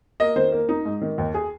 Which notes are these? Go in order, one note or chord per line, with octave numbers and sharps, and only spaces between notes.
A#3 D#5
D#3 C5
A#3
D#4
G#2
D#3
D#2
G#4